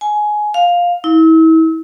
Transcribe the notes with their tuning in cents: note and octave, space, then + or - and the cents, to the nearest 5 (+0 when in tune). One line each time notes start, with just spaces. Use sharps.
G#5 +15
F5 +10
E4 -40